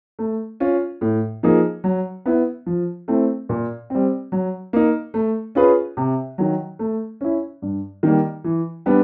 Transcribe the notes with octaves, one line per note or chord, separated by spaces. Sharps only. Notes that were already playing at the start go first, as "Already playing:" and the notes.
A3
C#4 F4
A2
F3 A#3 D#4 G#4
F#3
B3 E4
F3
A3 C4 E4
A#2
G3 C4
F#3
A#3 D#4
A3
C#4 F4 G#4 B4
C3
D#3 F#3
A3
C#4 E4
G2
D#3 G3 A#3
E3
G3 B3 D4